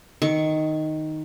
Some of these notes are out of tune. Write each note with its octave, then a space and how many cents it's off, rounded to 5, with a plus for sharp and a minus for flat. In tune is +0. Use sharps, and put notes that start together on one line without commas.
D#3 +0 C#6 +0